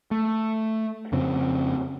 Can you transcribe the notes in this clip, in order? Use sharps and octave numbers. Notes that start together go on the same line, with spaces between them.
A3
F2 C#3 C4